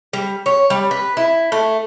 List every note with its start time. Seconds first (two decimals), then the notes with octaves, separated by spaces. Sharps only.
0.13 G3
0.46 C#5
0.70 G3
0.91 B4
1.17 E4
1.52 A3